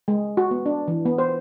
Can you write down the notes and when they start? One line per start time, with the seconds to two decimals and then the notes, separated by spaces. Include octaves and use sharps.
0.08 G#3
0.37 F#4
0.51 B3
0.66 D4
0.88 E3
1.06 B3
1.18 C5